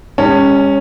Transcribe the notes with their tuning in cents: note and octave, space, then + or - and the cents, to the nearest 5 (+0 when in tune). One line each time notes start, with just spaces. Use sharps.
G#3 -45 C#4 +0 A5 +35